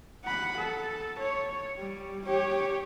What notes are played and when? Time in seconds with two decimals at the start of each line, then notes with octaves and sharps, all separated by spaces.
0.25 F#5 B5
0.57 A4
1.19 C#5
1.78 G3
2.25 G4 C#5